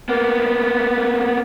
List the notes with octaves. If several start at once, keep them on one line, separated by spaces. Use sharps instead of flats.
A#3 B3